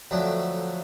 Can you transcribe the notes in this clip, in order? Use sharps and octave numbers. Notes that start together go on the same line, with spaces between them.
F2 D3 F#3 A3 D4